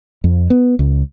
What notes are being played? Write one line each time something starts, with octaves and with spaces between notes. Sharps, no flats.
F2
B3
C#2